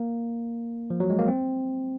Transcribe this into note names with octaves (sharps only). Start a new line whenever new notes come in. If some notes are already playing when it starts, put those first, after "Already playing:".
Already playing: A#3
F3
F#3
G#3
A#3
C4